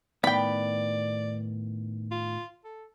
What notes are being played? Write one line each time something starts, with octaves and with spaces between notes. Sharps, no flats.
A2 D#3 B3 D5 G5 B5
F4
A4